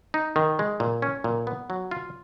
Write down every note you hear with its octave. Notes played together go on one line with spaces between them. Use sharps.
D#4
D#3
G#3
A#2
C#4
A#2
B3
F#3
F4